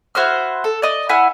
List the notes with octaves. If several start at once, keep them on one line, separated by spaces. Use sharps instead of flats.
E4 F#4 C5 F6
A4
D5 D#5
E4 F#5 G#5 F6